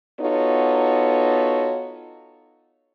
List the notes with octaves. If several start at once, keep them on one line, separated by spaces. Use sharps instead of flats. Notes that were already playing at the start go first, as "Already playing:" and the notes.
B3 D#4 F4 F#4 A4 C#5